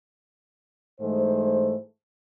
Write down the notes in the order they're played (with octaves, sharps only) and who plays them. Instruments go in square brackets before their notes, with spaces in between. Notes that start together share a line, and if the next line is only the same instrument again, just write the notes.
[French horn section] G#2 E3 A3 C5